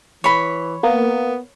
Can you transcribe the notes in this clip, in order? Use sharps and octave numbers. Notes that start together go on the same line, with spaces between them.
E3 C#5 B5
A#3 B3